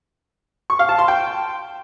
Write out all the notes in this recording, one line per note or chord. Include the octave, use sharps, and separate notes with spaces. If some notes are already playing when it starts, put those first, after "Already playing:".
C#6
F5
A5
C6
G5